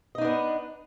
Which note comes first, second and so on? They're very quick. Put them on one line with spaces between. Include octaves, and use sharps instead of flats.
D#5 D#4 D4 B3